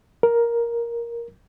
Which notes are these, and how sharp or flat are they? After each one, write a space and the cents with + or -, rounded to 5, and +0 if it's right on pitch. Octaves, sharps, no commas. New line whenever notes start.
A#4 +5